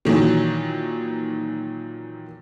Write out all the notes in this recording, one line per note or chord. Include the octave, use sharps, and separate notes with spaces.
A#2 D#3 E3 F#3